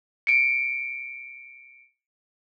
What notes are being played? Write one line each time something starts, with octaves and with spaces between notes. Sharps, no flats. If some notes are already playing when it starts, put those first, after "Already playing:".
C#7 D7